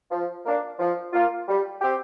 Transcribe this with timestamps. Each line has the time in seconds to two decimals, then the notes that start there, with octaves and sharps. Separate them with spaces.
0.11 F3
0.44 A#3 D4
0.79 F3
1.13 A#3 F4
1.48 G3
1.81 C4 G4